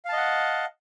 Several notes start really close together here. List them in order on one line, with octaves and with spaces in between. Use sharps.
F5 A5 D#5 F#5